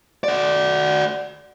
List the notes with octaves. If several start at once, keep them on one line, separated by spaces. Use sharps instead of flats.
F#4 D5